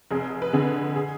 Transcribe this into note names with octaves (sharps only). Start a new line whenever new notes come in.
F1 G#4
B4
F2 D3 G#4
G#4